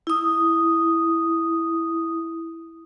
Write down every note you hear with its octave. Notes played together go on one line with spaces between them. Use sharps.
E4 D#6